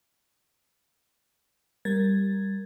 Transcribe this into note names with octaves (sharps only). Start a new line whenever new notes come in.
G3 A#4 G#6 A6